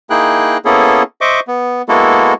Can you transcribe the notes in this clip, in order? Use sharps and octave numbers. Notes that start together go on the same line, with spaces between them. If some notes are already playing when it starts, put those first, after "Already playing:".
A#3 D#4 E4 G#4 G5 F#6
A#3 B3 C#4 E4 G#4 A4
C5 D#5 E5 C#6 D6
B3
G#3 A#3 B3 E4 F#4 A4